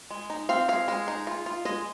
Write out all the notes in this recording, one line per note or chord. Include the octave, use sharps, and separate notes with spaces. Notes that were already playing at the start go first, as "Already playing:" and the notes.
G#3
D#4
C4 F5
G#3 F5
G#3
D#4
F4
F4
G#3 D#5